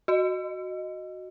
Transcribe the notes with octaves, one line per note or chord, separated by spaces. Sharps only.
F#4 D#5